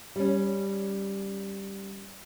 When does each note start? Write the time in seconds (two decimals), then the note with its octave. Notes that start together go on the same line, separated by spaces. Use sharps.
0.16 G3 C#4